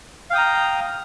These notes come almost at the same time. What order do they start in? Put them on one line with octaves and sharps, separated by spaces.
F5 G5 D#6 A#5